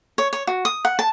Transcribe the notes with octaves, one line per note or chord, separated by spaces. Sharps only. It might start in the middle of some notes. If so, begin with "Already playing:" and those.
C#5
C#5
F#4
D#6
F#5
A5